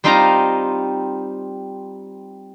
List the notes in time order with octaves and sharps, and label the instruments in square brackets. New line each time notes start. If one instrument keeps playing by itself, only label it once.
[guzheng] G3 C4 D#4 F4 D#5 A#5